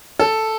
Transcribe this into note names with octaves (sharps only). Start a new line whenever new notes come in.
A4